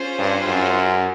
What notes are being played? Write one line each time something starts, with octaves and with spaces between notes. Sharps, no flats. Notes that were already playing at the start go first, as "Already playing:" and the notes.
Already playing: C#4 F4 G#4 C5
G2
F#2